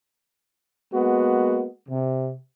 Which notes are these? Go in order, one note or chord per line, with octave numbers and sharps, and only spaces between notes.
G#3 A#3 B3 F#4
C3